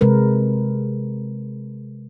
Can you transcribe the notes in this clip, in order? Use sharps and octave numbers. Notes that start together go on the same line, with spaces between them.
C3 G#3 A#4 B4